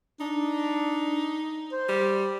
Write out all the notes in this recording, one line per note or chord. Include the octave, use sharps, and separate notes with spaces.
D4 D#4
C5
G3